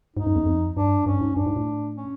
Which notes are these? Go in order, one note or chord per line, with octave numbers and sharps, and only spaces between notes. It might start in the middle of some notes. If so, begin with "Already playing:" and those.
G#2 D#4
F#2
E2
F2
G2 D4
G2 C#4
G#2
G2 D4
G#2
A2
C#4